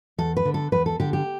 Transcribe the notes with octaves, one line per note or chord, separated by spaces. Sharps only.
E2 A4
B4
D3
A4
E2 B4
A4
D3 G4
G4